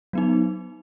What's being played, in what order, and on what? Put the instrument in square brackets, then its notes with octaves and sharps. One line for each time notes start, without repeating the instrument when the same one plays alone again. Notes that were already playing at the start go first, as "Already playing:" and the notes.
[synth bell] F#3 B3 D#4